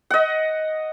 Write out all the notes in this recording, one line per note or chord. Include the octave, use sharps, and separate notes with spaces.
D#5 F#5